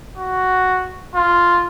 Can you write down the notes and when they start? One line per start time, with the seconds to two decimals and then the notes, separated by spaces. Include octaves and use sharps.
0.18 F#4
1.15 F4